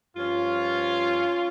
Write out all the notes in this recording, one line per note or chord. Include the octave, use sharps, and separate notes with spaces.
G2 F3 C#4 F4